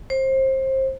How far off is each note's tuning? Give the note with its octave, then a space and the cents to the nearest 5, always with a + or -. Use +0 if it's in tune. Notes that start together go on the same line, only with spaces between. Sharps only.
C5 +25